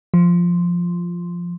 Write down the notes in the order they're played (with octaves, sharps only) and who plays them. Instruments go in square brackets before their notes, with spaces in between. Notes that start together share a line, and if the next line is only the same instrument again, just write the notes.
[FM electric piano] F3